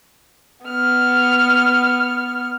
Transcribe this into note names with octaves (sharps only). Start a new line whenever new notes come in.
B3 F6